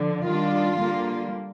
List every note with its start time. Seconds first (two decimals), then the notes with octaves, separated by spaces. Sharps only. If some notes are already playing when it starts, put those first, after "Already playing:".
Already playing: D3 F3
0.25 D#3 G3 D4 F4
0.78 D3 G3 A#3